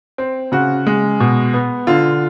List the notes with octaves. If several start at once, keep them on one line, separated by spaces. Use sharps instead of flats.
C4
C#3 F#4
G#3
B2
B3
D3 F4